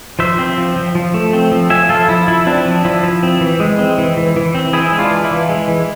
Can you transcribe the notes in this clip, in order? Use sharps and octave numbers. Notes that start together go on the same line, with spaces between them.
F3 C5 E5
C4
F3
F3
F3
A3
C4
F3
F3 E5 G#5
F3 F4 A4
F3 E4
F3 E4
C4 D4
F3
F3 E4
F3
C4
E3
G#3
C4
E3
E3
E3
C4
E3 E4 G#4
G#3
D4 F4
E3
E4
E3
G#3
E3